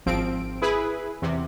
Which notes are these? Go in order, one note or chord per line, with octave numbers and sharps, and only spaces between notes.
G#1 F3 C4 D7
E4 G#4 B4
E2 C3